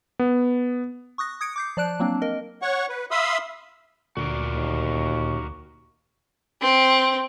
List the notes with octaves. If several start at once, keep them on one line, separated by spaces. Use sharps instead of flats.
B3
C#6 D#6 F#6 A#6
D#6 G#6 C#7 D7
D6 G6 C7
F3 D5 A5 F#6 D7
F#3 A#3 C4 D4
A#3 A#4 D#5
C#5 F#5 C#6
B4
E5 F5 B5 C6 D#6 E6
D2 A#2 F#4 A#4 D5
D#2
C4